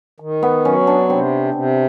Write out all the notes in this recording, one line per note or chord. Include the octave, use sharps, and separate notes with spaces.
D#3
B3
F#3 C#4
D4
C3 C4
C3